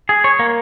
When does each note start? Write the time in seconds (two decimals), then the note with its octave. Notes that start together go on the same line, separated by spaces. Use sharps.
0.09 G#4
0.24 C#5
0.39 A#3